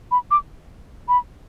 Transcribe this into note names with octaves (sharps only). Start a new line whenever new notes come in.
B5
D6
B5